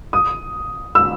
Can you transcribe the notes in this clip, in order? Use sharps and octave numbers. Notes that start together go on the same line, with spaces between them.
D#6
E6